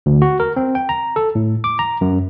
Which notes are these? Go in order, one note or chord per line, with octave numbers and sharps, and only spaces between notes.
D2
F#4
A#4
C4
G5
A#5
A4
A2
D6
A#5
F#2